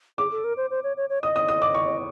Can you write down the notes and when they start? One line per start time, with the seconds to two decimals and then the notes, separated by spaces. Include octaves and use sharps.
0.18 G#4 D6
0.32 A4
0.44 A#4
0.57 C5
0.71 C5
0.84 C#5
0.97 C#5
1.10 C#5
1.23 D#5 D#6
1.36 D#6
1.48 D#6
1.62 D6
1.75 C#6